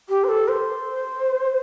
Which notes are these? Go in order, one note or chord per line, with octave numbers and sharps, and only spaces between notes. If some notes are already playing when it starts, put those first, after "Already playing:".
G4
C5
A4
C5